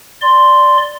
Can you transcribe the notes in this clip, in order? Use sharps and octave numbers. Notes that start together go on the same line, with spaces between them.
D5 C6